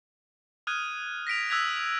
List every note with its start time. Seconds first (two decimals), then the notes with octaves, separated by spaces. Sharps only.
0.67 D#6 F6 F#6 G#6 D#7
1.27 A#6 B6 D7 F7
1.50 D#6 E6 F#6 G#6 B6 F7
1.77 F7